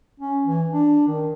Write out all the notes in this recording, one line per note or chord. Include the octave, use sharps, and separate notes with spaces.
C#4
E3
D4
D#3